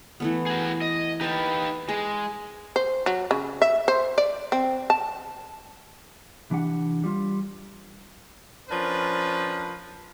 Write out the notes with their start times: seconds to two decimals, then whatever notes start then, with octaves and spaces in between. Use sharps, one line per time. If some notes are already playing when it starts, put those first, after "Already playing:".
0.20 E3 A3 B3
0.46 F#4 G#4
0.81 D#5
1.21 D#4 G4 B4 A5
1.89 G#3 G#4
2.76 C5
3.06 F#3
3.31 C#3
3.62 E5
3.88 C5
4.18 D5
4.52 C4
4.90 A5
6.50 C2 E3 D4 G4 F#5
7.04 G3 F4
8.70 F3 C#4 D4 A#4 B4